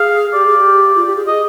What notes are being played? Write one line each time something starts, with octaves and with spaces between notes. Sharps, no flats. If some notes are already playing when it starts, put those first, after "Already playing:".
Already playing: G#4 F5
G4 D5
G#4
G4
F4
G4
G#4
G#4 D#5